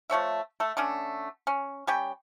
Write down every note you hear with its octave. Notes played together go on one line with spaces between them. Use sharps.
F3 A3 C#5 E5
A3 A4
D3 A3 C#4 D4
C#4
G3 C#4 G5